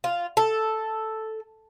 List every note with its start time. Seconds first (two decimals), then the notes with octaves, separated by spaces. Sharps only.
0.04 F4
0.37 A4